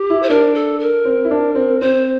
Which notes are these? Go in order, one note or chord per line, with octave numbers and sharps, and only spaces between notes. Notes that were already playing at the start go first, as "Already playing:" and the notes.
Already playing: G4
E4
C5
D4 A#4
A4
A#4
C4
E4
D4
C4
C4 C5